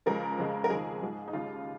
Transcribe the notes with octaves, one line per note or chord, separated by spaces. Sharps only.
C#2 C#3 F3 G#3 A#4
F2 C#3 G#3
A#4
F2 D#3 G#3 G#4
G#2 F3 G#3
D#4
D#2 C#3 G#3 F4